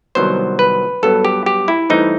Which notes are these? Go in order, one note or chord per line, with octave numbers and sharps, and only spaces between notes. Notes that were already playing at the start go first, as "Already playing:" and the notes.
C2 C3 D#3 F#3 B3 C5
B4
G2 F#3 B3 A4
G4
G4
E4
G2 E3 A3 C4 D#4